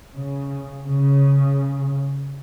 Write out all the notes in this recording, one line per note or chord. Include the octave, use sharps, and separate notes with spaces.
C#3
C#3